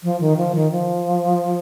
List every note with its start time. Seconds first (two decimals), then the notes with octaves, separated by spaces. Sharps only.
0.03 F3
0.21 D#3
0.37 F3
0.55 D#3
0.72 F3